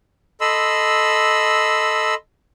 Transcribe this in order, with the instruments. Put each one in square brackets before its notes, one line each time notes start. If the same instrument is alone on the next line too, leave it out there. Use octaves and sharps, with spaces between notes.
[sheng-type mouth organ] A4 D#5 B5 C6 E6